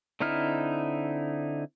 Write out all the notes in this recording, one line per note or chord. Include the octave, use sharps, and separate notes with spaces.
D3 C4 D#4 E4 F6